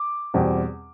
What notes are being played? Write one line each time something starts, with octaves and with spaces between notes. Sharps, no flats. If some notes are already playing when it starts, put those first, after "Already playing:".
Already playing: D6
E2 B2 G3 C4